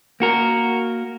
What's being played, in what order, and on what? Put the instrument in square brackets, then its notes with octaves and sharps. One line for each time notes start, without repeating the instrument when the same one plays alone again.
[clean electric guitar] A#3 F#4 A#4